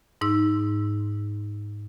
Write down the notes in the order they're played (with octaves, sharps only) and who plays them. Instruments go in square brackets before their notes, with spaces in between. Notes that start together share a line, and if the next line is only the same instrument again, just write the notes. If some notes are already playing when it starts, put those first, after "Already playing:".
[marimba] G#2 D#4 E6